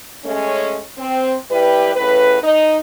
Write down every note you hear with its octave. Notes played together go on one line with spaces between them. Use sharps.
G#3 A3 C#4
C4
G3 E4 G4 B4
A2 C#3 B4
D#4